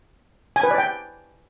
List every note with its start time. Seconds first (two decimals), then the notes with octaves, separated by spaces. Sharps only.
0.56 G#5
0.63 B4
0.71 D5
0.78 G5